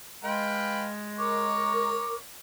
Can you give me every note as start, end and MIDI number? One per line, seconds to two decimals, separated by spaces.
0.24 2.04 56
0.24 0.88 71
0.24 0.88 77
0.24 0.88 79
1.19 2.18 70
1.19 2.21 73
1.19 2.21 85
1.19 2.16 86